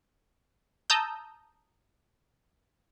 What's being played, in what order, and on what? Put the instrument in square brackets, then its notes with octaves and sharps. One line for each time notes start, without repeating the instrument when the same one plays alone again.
[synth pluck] A5 A#5 D#6 E6 G6